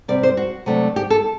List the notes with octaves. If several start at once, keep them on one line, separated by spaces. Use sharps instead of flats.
C3 G3 C4 D5
C5
F#4
C3 F#3 A3 D4
G4
A4